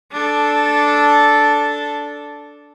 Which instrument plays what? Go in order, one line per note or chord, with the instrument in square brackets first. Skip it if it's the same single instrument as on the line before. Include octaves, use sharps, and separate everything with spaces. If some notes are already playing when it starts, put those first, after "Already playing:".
[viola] D4 A4